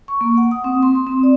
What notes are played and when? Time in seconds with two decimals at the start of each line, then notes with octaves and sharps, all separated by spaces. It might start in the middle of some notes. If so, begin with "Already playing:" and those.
0.08 C#6
0.21 A#3
0.37 F#5
0.51 D#6
0.64 C4
0.83 C6
0.95 C6
1.07 C4
1.23 D5